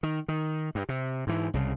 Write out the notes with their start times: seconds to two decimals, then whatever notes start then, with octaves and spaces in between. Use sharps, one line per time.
0.03 D#3
0.28 D#3
0.75 G2
0.89 C3
1.27 G#2 E3
1.54 C2 C#3